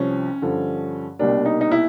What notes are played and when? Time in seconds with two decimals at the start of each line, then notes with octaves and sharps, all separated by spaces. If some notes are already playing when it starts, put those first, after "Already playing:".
Already playing: C2 C3 F3 C#4
0.42 G2 D3 F3
1.19 C2 B2 G3 A#3 D4
1.45 D#4
1.61 D#4
1.71 E4